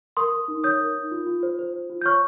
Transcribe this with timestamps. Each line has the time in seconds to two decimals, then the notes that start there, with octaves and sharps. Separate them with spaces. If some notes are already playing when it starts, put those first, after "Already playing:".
0.17 A#4 C6 D#6
0.32 A#4
0.48 D#4
0.64 C#5 D#6 G6
0.80 A#4
0.95 D#4
1.11 F4
1.26 F4
1.43 C5
1.59 C5
1.74 C5
1.90 F4
2.01 G6
2.05 C#5 C#6 F6